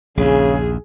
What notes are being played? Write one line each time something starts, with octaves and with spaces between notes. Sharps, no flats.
A#1 D#2 C#3 G#4